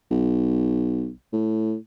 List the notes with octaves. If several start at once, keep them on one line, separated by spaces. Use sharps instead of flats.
B1
A2